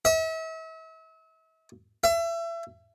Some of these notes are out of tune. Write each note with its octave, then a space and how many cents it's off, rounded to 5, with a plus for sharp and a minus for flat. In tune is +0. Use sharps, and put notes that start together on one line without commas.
E5 -40
E5 +30